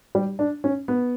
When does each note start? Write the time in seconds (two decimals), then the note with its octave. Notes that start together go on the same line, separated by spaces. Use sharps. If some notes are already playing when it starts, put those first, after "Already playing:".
0.15 G3
0.39 D4
0.64 C#4
0.88 B3